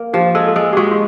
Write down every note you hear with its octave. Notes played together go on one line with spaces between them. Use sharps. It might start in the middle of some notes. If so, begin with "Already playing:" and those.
Already playing: A#3
F3 G4
G#3 A4
A4
G#3 G#4
G4
G#3 F#4
F4